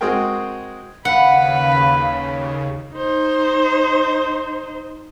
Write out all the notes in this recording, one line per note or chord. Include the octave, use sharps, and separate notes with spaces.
G#3 C4 F#4 G#4 A#4 G5
D#2 C#3 B4 F5 F#5 B5
D#4 C5